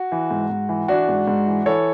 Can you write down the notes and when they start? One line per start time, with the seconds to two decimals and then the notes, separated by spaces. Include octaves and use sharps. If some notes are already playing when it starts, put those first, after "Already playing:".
Already playing: F#4
0.12 E3
0.31 G#2
0.50 G#2
0.69 E3
0.88 E3 D4 F#4
1.09 G#2
1.27 G#2
1.47 E3
1.66 E3 A4 C#5